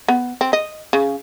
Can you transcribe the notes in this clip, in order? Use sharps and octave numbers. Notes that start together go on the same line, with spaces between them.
B3
C4
D#5
C#3